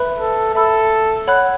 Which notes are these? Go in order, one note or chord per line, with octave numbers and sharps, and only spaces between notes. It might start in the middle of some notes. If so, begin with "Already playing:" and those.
Already playing: B4 E5 B5 F#6
A4
A4 E5 B5 E6
C#5 F#5 B5 F#6